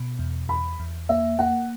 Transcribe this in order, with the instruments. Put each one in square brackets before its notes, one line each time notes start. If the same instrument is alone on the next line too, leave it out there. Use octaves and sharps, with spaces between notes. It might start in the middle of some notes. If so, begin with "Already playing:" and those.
Already playing: [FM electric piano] B2
E2
[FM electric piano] E2 [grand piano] B5
[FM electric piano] E2
[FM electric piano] A#3 [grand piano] E5
[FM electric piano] A#3 [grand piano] F#5